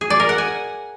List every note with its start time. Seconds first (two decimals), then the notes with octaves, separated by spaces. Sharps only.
0.01 G#4
0.10 D5
0.20 A#4
0.29 F#5
0.38 G#5